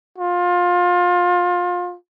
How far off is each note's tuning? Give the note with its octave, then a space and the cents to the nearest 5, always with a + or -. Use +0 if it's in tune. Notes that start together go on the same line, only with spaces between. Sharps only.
F4 +25